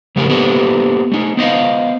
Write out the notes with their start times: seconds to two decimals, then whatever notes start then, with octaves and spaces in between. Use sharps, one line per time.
0.16 F2 C#3 A3 G4 A#4 G#5
0.28 A#3 B3 G4 A4 B4 C5
1.12 A3 D#4
1.37 B3 C5 D#5 F5